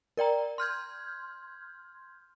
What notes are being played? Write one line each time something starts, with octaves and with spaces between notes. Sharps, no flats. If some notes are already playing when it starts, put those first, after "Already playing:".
A#4 D5 G5 A#5
C6 F6 G6 G#6